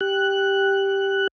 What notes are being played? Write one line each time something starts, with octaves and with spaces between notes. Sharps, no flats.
G4 F#6